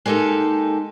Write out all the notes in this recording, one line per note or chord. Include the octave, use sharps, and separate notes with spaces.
G#3 A#3 D#4 G4 A4